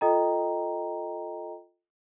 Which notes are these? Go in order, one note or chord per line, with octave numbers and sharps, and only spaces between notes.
F4 A4 D#5 G5 A#5